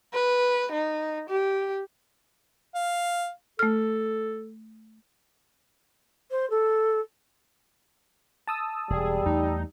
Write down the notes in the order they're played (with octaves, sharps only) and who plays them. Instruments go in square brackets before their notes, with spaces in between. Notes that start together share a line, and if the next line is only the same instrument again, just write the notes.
[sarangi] B4
D#4
G4
[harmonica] F5
[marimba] A3 F6 [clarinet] A4
[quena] C5
A4
[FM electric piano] A5 D#6 E6
[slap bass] E1 [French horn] G3 [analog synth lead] G#4
[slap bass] E2 A3 [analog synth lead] D#4